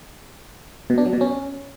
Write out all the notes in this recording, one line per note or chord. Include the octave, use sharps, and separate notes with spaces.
B2
D4
F#3
B2
C#4